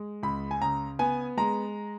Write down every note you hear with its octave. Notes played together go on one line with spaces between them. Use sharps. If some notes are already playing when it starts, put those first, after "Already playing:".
Already playing: G#3
C#2 B5
G#5
C#3 A#5
B3 G#5
G#3 A#5